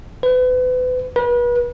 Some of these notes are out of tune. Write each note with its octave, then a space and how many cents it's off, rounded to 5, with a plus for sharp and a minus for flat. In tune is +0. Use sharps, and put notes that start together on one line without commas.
B4 +35
B4 -35